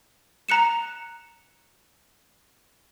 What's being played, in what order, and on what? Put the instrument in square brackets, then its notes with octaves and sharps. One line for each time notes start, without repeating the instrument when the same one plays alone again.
[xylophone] A#5 F#6 C#7 E7